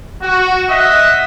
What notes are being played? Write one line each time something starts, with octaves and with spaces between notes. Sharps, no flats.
F#4
D#5 E5 F#5